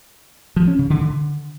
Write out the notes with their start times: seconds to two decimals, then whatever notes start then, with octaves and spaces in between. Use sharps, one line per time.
0.56 F3
0.68 C#4
0.79 C#3
0.90 D3
1.01 D3